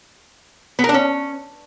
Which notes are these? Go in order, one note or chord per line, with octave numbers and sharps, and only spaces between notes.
B3
A#4
D4
C#4